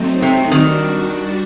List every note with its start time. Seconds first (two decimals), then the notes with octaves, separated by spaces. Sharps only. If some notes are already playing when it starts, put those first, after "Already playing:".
Already playing: F#3 A3 C4 D#4
0.22 C3
0.52 D#3 G3 D4 F#4